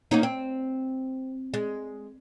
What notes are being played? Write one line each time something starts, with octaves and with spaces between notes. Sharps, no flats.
A#3 C#4 D#4
C4
G#3